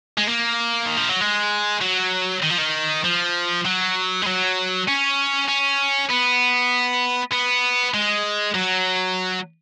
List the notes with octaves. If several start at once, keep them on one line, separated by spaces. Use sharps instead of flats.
G#3
A#3
D#3
F3
F#3
G#3
F#3
D#3
F3
D#3
F3
F#3
G#3
F#3
C#4
C#4
B3
B3
G#3
F#3